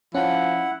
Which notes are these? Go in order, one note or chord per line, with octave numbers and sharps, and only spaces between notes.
F3 C#4 E4 F#5